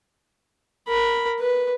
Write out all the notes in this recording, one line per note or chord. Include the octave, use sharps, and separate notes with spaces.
A#4 B5
B4